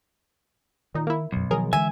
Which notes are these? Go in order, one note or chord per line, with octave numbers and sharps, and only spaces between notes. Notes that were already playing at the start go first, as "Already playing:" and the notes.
A#2 D#3 D#4
A#3 E4
B1 F#2 F#3
D#3 F3 F#3 G#4 A#4
D3 E3 G#3 E5 G#5